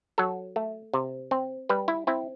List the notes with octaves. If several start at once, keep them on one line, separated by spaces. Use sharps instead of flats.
F#3 A4
A3
C3
C4
G3 B4
E4
C4 E4